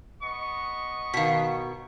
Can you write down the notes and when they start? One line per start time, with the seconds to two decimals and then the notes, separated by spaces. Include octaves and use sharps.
0.23 B3 D#5 C#6
1.14 B2 D#3 F5 B6